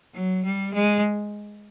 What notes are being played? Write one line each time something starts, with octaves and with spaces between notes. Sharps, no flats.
F#3
G3
G#3